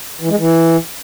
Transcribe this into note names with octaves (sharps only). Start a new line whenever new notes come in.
E3
G#3
E3